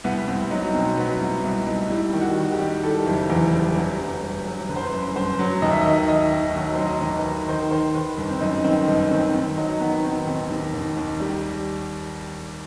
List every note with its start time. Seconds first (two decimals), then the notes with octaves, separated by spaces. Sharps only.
0.04 C2 B3
0.28 C2 C4
0.51 F#3 D#4
0.74 B2 C4
0.97 F#3 B3
1.20 C2 C4
1.43 C2 D#4
1.67 C2 D#4
1.90 G3 E4
2.13 D#3
2.21 F#4
2.37 D#3
2.52 G4
2.60 G3
2.83 D#3 A4
3.06 F#1
3.30 E2
3.53 G3
3.76 F#3
3.99 G1
4.23 G1
4.45 F#3
4.69 G1 B4
4.76 C5
4.84 B4
4.92 F#2
5.16 G1 C5
5.39 F#3
5.62 D#2 D#5
5.71 E5
5.81 D#5
5.86 D#3
6.08 D#3 D#5
6.32 D#3
6.55 F#3 D#5
6.74 F#3 C5
6.86 D#5
7.02 D#2
7.17 B4
7.25 D#3
7.48 D#3 C5
7.71 D#3 C5
7.95 D#3 B4
8.18 G1
8.30 C4
8.41 F#2 D#4
8.64 D#3 C4
8.88 G1 D#4
9.11 D#3 C4
9.34 D#3 C4
9.57 F#3 D#4
9.81 D#3 B3
10.04 D#3 C4
10.27 D#2 C4
10.50 D#2
10.74 D#2
10.97 D#2
11.20 G3